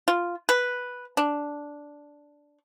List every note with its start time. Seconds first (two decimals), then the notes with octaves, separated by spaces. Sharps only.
0.08 F4
0.49 B4
1.17 D4